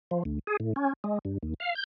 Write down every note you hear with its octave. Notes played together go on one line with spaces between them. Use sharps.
F3
D2
G#4
A2
C#4
G#3
G2
D#2
F5
G6